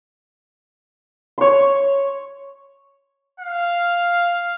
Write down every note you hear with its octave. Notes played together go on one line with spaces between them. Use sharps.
C#5 C6
F5